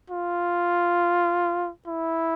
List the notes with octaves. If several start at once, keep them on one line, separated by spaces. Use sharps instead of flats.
F4
E4